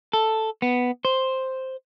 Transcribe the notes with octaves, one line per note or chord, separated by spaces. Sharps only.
A4
B3
C5